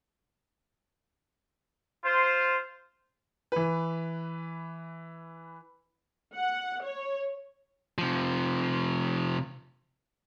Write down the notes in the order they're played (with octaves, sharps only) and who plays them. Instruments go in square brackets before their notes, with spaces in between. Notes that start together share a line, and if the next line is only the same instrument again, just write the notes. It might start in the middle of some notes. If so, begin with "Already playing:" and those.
[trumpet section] F4 C5
[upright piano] E3 B4
[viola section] F#5
C#5
[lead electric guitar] C3 F3